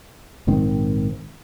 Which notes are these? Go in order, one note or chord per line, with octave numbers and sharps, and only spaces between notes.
A#1 G#2 D#3 C4